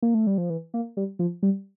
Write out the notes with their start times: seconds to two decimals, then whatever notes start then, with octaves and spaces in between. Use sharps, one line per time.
0.02 A#3
0.14 A3
0.27 G3
0.38 F3
0.50 E3
0.74 A#3
0.97 G3
1.19 F3
1.43 G3